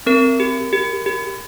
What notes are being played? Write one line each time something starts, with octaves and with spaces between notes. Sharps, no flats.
C4 A#4
G4
G4
G4